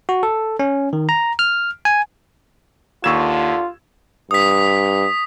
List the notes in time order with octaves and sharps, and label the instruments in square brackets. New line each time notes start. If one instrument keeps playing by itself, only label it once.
[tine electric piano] F#4
A4
C#4
D#3
A#5
F6
G#5
[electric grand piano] D#2 E7 [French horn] D3 [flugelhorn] F4 [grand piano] C#6 E6 G#6
[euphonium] G2 [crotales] D#6 B6